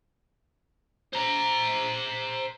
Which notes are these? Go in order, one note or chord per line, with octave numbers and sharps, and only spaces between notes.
C5 A#5